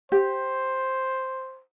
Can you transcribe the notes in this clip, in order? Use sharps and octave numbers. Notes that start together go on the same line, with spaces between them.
G4 C5